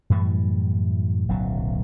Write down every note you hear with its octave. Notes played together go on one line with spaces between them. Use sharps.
F#2 A2 E3 G3
D1 B1 C#3 F#3